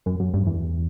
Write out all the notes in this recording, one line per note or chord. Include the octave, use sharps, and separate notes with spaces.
F#2
F#2
G2
E2